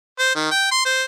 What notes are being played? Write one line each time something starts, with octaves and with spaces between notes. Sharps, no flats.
C5
D#3
G5
C6
C5